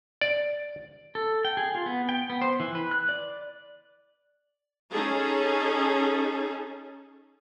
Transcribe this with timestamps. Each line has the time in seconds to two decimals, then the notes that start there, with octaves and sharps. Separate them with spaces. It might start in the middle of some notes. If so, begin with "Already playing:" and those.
0.21 D5
1.15 A4
1.45 G5
1.57 G#4
1.75 F4
1.86 B3
2.09 G5
2.30 B3
2.42 C5
2.60 E3
2.75 B4
2.91 F#6
3.09 D5
4.91 C#4 D#4 G#4 A4